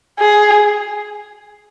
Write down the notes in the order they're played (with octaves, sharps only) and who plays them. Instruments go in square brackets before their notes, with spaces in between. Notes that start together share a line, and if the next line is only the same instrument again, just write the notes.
[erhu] G#4